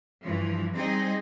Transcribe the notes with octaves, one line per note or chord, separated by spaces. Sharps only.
G2 E3 F3
G3 C4 D#4 G#4 D#5